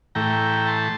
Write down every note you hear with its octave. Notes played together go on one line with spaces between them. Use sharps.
A2 E3 A3 G5 A#5
A5 C6